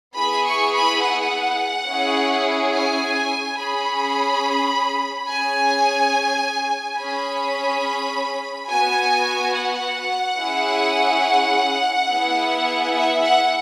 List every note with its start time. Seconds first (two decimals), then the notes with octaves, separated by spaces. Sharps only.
0.17 B3 E4 G#4 B5
0.46 C#6
0.74 B5
1.03 F#5
1.88 C#4 E4 G#4
2.73 G#5
3.58 C#4 G#4 B5
5.28 C#4 G#4 G#5
6.98 C#4 G#4 B5
8.68 B3 F#4 G#5
9.54 F#5
10.39 C#4 E4 G#4
12.09 B3 E4 G#4
12.94 E5
13.22 F#5